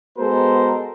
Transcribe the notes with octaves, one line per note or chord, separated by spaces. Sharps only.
G#3 B3 F#4 A4 A#4 C5